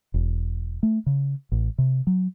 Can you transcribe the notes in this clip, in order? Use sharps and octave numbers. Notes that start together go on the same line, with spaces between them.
E1
A3
C#3
A1
C3
F#3